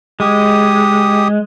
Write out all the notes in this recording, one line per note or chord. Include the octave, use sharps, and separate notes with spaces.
G#3 G4 D#6